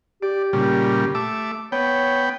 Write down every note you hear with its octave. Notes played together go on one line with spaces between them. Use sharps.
G4 D5
A#2 C#3 G3
A3 E5 D6
B3 C#5 G5